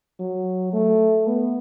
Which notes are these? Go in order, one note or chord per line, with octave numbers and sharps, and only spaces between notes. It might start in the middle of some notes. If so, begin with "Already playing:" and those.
F#3
A3
B3